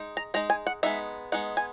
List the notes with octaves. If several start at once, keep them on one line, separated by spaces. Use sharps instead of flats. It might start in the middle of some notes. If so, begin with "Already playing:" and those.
Already playing: G#3 D#4
A#5
G#3 D#4 A#5
G#5
F#5
G#3 B3 D#4 E5
G#3 B3 D#4 F#5
G#5